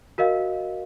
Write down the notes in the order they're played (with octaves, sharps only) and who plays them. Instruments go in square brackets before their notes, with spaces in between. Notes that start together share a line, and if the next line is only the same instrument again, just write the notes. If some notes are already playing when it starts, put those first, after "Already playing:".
[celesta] F#4 A#4 D#5 F5